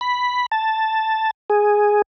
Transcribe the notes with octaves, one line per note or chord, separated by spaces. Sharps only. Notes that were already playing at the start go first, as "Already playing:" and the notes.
B5
A5
G#4